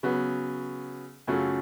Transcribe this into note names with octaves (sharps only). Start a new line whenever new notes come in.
C#3 F#3 B3
F#2 C#3 F#3 A3 F4